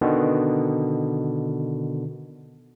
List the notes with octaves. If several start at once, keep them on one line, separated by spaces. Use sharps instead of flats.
B2 D3 D#3